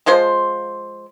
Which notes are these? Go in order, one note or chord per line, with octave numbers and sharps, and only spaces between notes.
F3 G#3 F4 C5